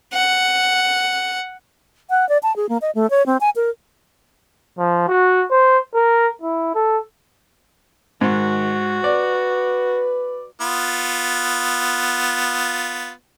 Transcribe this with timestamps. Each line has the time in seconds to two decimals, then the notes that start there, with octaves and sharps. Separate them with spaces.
0.13 F#5
2.10 F#5
2.29 D5
2.43 A5
2.56 G#4
2.69 A#3
2.81 D#5
2.95 A3
3.10 C#5
3.26 C4
3.40 G#5
3.56 A#4
4.78 F3
5.08 F#4
5.51 C5
5.94 A#4
6.42 E4
6.75 A4
8.21 G#2 D#3 F#4
9.04 B4 D5
10.61 B3 F4